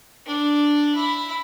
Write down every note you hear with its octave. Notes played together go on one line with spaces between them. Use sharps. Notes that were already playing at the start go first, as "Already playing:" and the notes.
D4
E4